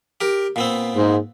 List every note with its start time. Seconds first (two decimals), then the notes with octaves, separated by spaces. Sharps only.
0.21 G4 A#4
0.56 A#2 B3 C4
0.96 G#2